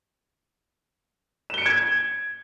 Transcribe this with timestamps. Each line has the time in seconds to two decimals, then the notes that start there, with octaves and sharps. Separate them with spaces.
1.50 E7
1.54 G7
1.58 C#7
1.62 D7
1.66 G#6